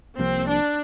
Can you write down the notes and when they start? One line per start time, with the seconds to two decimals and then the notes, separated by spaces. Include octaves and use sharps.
0.18 C2 C3 F3 A#3 C4
0.47 D4